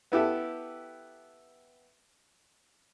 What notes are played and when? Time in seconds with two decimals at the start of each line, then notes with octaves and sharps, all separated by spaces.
0.12 B3 E4 G4 A4